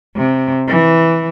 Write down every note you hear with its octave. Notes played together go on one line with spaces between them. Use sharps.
C3
E3